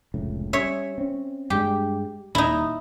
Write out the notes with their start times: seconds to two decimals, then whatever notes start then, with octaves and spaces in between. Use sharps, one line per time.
0.14 F1 C#2 A2
0.53 G3 A#3 C#4 C#5 E5
0.98 C4 C#4
1.50 G2 G#3 D4 G4
2.35 D#1 D#2 D#4 E4